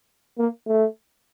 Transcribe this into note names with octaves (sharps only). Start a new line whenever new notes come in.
A#3
A3